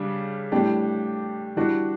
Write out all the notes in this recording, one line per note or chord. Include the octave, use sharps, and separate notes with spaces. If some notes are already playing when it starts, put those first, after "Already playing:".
Already playing: C#3 G3 D4
A2 G3 D4 G4
E3 G3 D4 F#4